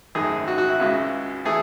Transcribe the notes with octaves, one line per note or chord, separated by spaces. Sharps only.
G#1 F#2 D#3 A3 G#4
F#4
F#4
E4
C#2 C#3 G#3
E3 A3 G#4